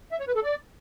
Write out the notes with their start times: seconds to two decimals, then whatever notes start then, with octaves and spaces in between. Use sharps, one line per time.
0.12 E5
0.20 C#5
0.28 B4
0.35 A4
0.43 D5